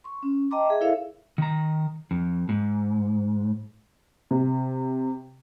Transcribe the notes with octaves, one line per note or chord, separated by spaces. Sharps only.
C6 C#6
C#4
D#5 G5 A5 A#5 C6 D6
G#4 E5
E4 A4 A#4 C#5 E5 F5
D#3 A#5
F2
G#2
C3